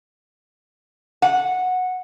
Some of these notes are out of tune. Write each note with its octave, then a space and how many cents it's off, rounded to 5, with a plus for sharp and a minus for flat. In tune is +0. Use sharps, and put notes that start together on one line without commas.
F#5 -10